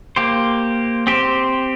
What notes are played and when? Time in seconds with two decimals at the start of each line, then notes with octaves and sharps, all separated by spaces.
0.16 A#3 G4 C5
1.07 C4 G4 C5